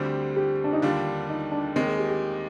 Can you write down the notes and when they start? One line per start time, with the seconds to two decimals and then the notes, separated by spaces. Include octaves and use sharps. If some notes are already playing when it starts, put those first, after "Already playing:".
Already playing: D2 D3 G3 C4 G4
0.36 G4
0.64 D4
0.73 D#4
0.82 D#2 D3 G3 D4 F4
1.29 D#4
1.52 D4
1.76 D#2 D#3 G#3 C4
1.86 G#4
1.99 G4
2.10 G4